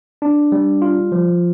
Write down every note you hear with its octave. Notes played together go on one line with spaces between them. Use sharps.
D4
G3
F4
F3